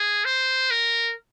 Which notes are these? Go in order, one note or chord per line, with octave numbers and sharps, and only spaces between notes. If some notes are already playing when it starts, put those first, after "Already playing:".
Already playing: G#4
C5
A#4